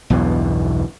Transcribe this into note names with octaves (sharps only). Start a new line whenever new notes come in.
B1 E2 G2 B2